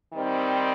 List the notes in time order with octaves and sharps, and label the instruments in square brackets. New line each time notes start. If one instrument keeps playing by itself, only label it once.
[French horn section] D#3 G3 C4 D#4